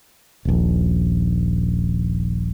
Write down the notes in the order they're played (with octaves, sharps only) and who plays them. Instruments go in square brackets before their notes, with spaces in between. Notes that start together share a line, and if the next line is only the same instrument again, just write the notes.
[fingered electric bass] D#1 A#1